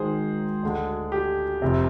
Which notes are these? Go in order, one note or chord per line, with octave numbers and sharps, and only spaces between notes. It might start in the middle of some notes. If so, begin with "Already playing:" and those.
Already playing: G#1 G#2 D#3 G#3 G#4 C5
D2 D3 G#3
G4
F1 F2 C3